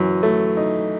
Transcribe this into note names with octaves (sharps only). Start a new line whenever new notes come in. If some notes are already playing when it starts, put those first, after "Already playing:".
Already playing: F#2 E3
A3
D#4